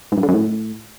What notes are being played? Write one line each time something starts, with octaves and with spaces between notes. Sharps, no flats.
G#2
G2
D3
F#2
A2